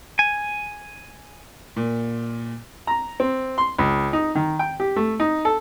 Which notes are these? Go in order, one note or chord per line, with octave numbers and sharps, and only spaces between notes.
G#5
A#2
A#5
C4
C6
C#2
D#4
D#3
G5
G4
A3
D#4
A4